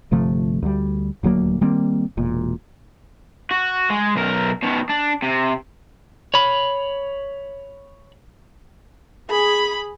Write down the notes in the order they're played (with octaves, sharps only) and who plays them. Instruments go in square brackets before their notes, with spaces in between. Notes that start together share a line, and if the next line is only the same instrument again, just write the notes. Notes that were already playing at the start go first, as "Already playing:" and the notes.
[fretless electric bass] G1 C3 F3 A3
D2 G3
D#1 D2 F#3 A#3
D#3 G3 A#3 C4
E1 A#2
[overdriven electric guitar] F#4
G#3
B1 A#4
B2 D#3
D4
C3
[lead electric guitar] C#5 B5
[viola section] G#4 [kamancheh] B5